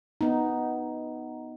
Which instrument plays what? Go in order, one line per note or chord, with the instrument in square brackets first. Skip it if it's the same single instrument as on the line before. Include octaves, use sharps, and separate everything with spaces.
[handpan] B3 D#4